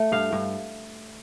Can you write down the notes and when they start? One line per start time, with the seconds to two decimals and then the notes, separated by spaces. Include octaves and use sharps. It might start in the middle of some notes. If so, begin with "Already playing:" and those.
Already playing: A3
0.12 G2 F5
0.33 G2